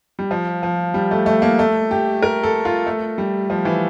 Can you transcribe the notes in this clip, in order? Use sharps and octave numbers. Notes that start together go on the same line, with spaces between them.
G3
F3
F3
G3
A3
A3
A#3
A3
G4
A#4
A4
F4
A3
G3
F3
E3